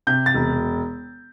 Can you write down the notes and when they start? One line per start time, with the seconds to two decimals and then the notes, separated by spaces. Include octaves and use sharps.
0.07 C3 G6
0.26 A6
0.34 E1